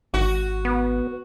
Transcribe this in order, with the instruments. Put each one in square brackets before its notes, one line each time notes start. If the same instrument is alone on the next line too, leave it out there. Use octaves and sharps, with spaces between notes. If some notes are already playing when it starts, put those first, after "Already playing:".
[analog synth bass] G#1 [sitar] F#4
[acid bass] B3